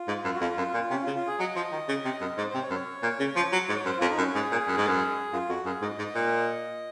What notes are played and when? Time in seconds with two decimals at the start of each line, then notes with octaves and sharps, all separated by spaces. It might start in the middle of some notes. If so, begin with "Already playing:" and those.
Already playing: F4
0.08 G#2
0.25 F#2
0.35 F#4
0.41 F2 F4
0.57 F#2
0.74 A#2
0.90 C3 C#4
1.02 F4
1.07 C#3
1.15 F4
1.27 G#4
1.39 F#3 D#5
1.56 F3
1.72 D#3
1.89 C#3
2.05 C3
2.21 F#2
2.38 G#2 C5
2.50 C3 C5
2.62 C#5
2.70 F#2
2.75 C#5
3.03 A#2
3.20 C#3
3.36 F3
3.52 F#3
3.69 G#2
3.73 C#5
3.85 F#2 C5
3.98 F2 F4
4.10 D#4
4.18 F#2
4.22 C#4
4.34 G#2 G#4
4.52 A#2
4.68 F#2
4.77 G#2
4.87 F#2
5.33 F#2 F4
5.49 F2 F#4
5.65 F#2 G#4
5.82 G#2 D#5
5.99 G#2
6.15 A#2